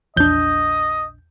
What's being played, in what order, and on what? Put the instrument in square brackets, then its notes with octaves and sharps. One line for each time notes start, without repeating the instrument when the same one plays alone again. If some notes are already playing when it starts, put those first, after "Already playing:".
[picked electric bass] A#1 D4 [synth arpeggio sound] E2 G6 [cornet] D#5